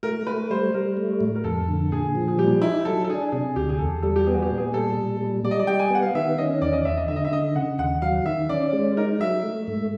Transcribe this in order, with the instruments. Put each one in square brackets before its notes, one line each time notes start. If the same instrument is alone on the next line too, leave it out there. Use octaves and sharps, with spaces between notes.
[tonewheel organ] A3 [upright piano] A#4
[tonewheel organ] A3 [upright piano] B4
[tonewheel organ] G3 [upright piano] C5
[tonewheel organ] G3 [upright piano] A#4
[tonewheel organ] A3
A2
[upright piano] A#4
[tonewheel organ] F2 [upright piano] A4
[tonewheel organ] D3
[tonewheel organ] A#2 [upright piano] G#4
[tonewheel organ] F3
[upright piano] G#4
[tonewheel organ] G3 [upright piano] G4
[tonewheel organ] D#4 [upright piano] E4
[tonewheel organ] F#3 [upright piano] A4
[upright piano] A4
[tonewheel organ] D4 [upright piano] G#4
[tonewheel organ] C3 [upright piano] G#4
[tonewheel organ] D2 [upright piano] G4
[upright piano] G#4
[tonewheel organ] E2 [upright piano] A4
[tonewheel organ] G3 [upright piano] A4
[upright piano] G4
[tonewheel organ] B3 [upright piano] G#4
[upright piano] F#4
G4
[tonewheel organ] A#2
[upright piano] G#4
[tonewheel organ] G3 [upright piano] A4
[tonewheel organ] A#2
G3
[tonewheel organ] G3 [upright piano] D5
[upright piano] D#5
D5
[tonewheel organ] G3 [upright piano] G5
[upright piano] G#5
[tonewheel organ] B3 [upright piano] F#5
[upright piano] F5
[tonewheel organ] D#3 [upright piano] E5
[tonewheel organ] C#4 [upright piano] D#5
[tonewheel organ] E2 [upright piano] D5
[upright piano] D#5
[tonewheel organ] E2 [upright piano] E5
[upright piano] D#5
[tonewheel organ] D3 [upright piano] E5
[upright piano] D#5
E5
[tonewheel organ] D3 [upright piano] D#5
[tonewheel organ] C#3 [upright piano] F#5
[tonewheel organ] D#2 [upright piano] F#5
[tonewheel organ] F#3 [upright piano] F5
[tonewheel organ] D#3 [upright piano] E5
[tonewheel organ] C#4 [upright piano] D5
[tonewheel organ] G#3
[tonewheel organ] D#4 [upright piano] A#4
[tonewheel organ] F#3 [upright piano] E5
[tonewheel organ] A3
G#2